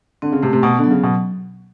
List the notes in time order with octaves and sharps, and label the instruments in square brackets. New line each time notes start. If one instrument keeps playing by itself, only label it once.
[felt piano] D3 [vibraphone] C4
[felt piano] C#3
[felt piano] C3 [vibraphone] A3
[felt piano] C3
[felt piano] B2 [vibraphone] B3
[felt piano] D3
[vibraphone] F#3
[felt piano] C#3
B2